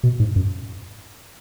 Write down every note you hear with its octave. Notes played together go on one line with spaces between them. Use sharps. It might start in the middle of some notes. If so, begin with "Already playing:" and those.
B2
G#2
F#2